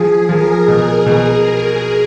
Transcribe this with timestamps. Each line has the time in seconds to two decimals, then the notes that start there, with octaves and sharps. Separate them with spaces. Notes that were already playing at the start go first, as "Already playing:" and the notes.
Already playing: F3 G#4
0.29 F3 A#4
0.68 B2
1.06 B2